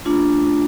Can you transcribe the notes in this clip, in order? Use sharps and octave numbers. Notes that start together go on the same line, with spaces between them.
A3 D4 F4